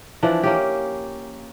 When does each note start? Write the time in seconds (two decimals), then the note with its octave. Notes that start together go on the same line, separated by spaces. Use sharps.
0.23 E3 F3 D4
0.43 A#3 C#4 G4